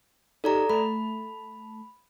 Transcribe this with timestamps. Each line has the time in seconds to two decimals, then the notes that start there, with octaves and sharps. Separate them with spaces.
0.44 D#4 G4 A4 D5 A#5
0.70 A3 A5 B5